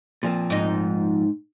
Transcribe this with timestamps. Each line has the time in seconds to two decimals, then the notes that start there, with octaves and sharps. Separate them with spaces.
0.23 A#2 F3 C4
0.50 G#2 D#4